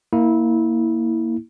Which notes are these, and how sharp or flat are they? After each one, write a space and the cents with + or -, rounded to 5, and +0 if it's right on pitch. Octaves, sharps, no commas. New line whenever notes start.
A#3 +0 E4 -20